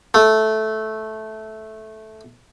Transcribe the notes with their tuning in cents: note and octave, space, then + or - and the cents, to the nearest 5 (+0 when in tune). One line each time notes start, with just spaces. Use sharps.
A3 -10